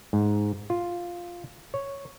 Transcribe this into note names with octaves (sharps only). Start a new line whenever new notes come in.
G#2
F4
C#5